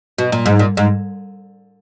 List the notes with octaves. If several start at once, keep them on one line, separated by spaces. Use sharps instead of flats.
B2
A#2
G#2
A#2
G#2